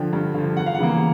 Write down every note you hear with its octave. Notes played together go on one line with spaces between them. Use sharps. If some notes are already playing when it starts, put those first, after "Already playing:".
Already playing: D3 F3 G5
G2
D3 F3
E2 F#5
F5
F#5
C#3 E3 G3 A#3